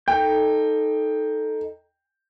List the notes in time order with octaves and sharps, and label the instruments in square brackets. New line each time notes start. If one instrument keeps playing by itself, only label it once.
[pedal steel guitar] D#4 A4 G6 [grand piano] G5